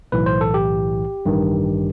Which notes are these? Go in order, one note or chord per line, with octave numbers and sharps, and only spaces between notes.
B1 A2 E3 B4
C5
A4
G4
A1 G2 D#3